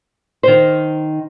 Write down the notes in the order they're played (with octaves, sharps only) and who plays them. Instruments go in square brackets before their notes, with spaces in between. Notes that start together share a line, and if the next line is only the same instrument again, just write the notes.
[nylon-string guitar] D#3 C5